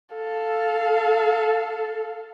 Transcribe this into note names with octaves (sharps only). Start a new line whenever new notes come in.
A4 F5